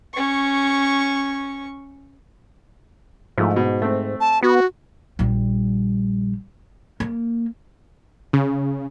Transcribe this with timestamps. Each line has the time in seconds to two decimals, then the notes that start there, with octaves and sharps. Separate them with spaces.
0.14 C#4 C#6
3.38 G#2 F3 A3
3.56 B2
3.82 A3 C4
4.20 A5
4.43 B3 F#4
5.19 A#1 G3
7.00 A#3
8.33 C#3